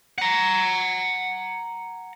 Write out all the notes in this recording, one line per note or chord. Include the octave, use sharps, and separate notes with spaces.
F#5 A#5